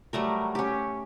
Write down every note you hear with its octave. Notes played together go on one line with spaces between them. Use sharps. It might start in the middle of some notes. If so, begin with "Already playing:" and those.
F#3 G3 A3 A#4
C#4 G4